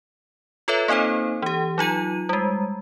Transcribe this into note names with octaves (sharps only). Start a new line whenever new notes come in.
F4 A4 B4 C#5 E5
A#3 C4 D#4 A4 C5
E3 G4
F#3 D#4 F4 D#7
G3 G#3